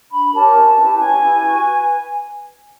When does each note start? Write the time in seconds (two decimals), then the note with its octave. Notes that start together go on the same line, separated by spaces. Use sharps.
0.10 D4 B5
0.32 G4 A#4 C#5 A5
0.54 C#4
0.76 E4 G4 B4
0.97 C#4 G#5
1.19 E4 G4 B4
1.41 F#4
1.63 B4